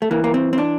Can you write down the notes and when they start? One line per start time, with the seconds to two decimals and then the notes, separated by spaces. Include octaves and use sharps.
0.02 A3
0.11 E3 A#3
0.24 A#3
0.34 C4
0.53 C4
0.58 D4